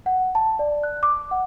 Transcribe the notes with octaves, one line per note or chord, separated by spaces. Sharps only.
F#5
A5
D5
F#6
D6
F#5